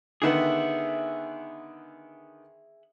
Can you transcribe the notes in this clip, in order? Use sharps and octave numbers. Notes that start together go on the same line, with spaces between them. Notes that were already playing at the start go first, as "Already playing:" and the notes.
D3 D#3 B3 G#4 E5 F#5